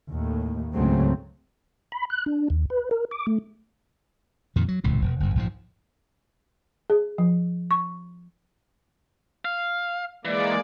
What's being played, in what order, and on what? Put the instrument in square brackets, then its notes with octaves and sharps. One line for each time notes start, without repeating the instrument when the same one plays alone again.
[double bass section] D#2 A2
C#2 G#2 C#3 F#3 A3 C4
[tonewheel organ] B5
F#6
D4
D#2
B4
A#4
D6
A3
[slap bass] F2 A#2 D#3
F#3
D#1 C#2 A2 C3
E1
F#1 G2
A#1 G#2 F3
[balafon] G#4
F3
C#6
[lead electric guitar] F5
[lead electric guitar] E3 [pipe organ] G#3 A#3 D5